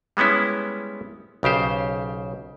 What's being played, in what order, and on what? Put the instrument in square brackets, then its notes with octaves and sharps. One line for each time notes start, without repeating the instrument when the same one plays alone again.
[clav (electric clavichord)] G3 G#3 B3 C#4 E4
B1 C#3 G4 C5